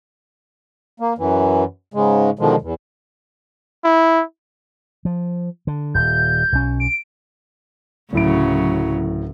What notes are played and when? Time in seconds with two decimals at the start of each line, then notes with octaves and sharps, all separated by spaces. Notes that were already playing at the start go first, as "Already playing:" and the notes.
1.00 A#3
1.18 F#2 E3
1.94 G#2 C#3 G#3
2.39 B2 D3 D#3 F3 G#3
2.61 E2
3.84 E4
5.05 F3
5.67 D3
5.94 D#1 G6
6.52 B1 C#4
6.80 D7
8.13 D1 A2 C#3 F#3 D7